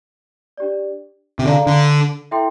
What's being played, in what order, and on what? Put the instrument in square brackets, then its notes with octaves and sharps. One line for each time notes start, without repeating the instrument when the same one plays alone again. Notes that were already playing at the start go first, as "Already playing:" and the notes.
[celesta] D4 G4 D5
[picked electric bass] C3
[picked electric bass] D3 [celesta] A4 D5 F5 A#5
[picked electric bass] D3
[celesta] E4 A4 E5 G5 C6